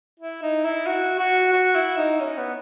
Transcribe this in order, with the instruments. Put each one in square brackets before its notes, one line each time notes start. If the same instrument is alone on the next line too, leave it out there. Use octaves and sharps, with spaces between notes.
[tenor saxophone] E4
D#4
E4
F#4
F#4
F#4
E4
D#4
C#4
B3